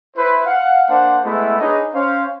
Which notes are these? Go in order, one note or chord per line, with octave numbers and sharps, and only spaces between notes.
E4 B4 C5
F5 F#5
A#3 D4 C5 F#5
G#3 A3 B3 E4
D4 D#4 G#4 B4 C#5 D#5
C#4 C5 F5